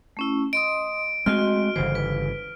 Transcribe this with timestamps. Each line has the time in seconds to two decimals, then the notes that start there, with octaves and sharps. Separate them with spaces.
0.17 A3 C#4 E4
0.53 D#5 C6 D#6 D7
1.26 G#3 A3 C4 F#4 D#5 C6 F6
1.76 G1 C#3 E3 C5
1.95 B4